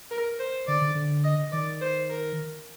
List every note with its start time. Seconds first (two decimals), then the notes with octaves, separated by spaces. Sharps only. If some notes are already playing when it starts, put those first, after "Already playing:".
0.11 A#4
0.39 C5
0.67 D3 D5
0.81 D3
0.95 D3
1.24 D#5
1.52 D#3 D5
1.81 C5
2.10 A#4